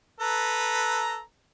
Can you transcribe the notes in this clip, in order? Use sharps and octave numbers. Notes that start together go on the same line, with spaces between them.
A4 B4 A#5